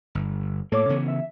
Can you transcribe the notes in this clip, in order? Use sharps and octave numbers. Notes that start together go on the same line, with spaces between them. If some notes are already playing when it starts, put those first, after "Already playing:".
G1
A2 A#3 A4 C#5 D6
C#3 E3 B3
E5